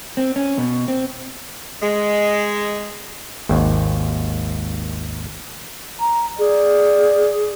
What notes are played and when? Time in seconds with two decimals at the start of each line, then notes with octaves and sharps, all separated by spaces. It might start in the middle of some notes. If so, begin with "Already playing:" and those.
0.17 C4
0.36 C#4
0.58 B2
0.88 C4
1.81 G#3
3.49 G#1 D#2
6.00 A#5
6.39 G#4 D5